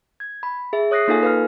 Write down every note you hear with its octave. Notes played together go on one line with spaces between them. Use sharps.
G#6
B5
G#4 E5
C#5 D#6 F#6 A#6 C7
A#3 D#4 F4 A4 F5 G#5
B4 F5 F6